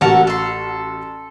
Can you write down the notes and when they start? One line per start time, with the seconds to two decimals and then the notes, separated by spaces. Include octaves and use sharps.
0.01 A1 F#4 A4 A#4 F#5
0.27 A4 C6